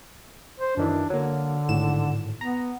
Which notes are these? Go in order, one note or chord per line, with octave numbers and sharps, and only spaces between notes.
C5
F#2 D#3 E3 D4
D3 F#3 A#3
G#1 A2 E7
B3 A#5